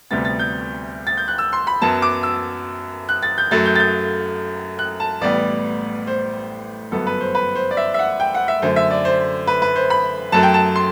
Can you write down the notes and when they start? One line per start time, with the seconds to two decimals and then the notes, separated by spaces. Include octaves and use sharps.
0.11 D2 C3 G3 B3 A6
0.25 A6
0.39 G6
1.07 A6
1.17 G6
1.28 F#6
1.38 E6
1.53 C6
1.67 B5
1.81 F#2 F#3 B3 A5
2.02 D6
2.23 E6
3.09 F#6
3.23 A6
3.38 G6
3.51 F#2 F#3 A3 A6
3.65 G6
3.76 A6
3.79 G6
4.79 F#6
5.00 A5
5.21 A1 A2 G3 B3 D5
6.07 C5
6.92 G1 F#2 F#3 B3 A4
7.07 B4
7.20 C5
7.35 B4
7.55 C5
7.71 D5
7.77 E5
7.94 E5
7.99 F#5
8.20 G5
8.34 F#5
8.48 E5
8.62 F#2 D3 A3 C5
8.76 E5
8.91 D5
9.05 C5
9.47 B4
9.62 B4
9.76 C5
9.90 B5
10.32 F#2 F#3 A3 A5
10.43 G5
10.54 A5
10.76 C6